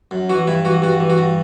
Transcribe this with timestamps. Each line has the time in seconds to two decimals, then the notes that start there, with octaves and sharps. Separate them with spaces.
0.11 F#2
0.29 E3 F#4
0.47 G2 E4
0.65 E3 F#4
0.82 G2 F#4
1.00 E3
1.10 F#4
1.18 G2